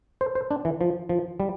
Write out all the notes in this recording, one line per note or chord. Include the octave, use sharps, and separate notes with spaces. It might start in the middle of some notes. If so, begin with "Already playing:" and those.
C5
C5
D4
E3
F3
F3
G3